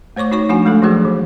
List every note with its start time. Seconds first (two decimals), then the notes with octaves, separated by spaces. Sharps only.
0.16 A3 C5 C#5 C#6 D6
0.32 D#4 F#4 C#5 C#6
0.49 F3 A3 D4 F#4 F#5 G#5
0.65 G#3 A3 D4 A4
0.82 F3 F#3 A#3 F#4 G#4 C5
1.05 E3